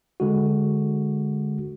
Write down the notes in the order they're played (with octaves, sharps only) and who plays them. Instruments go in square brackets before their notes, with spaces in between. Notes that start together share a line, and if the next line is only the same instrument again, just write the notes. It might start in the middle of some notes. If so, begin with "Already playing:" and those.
[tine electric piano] D3 G#3 F#4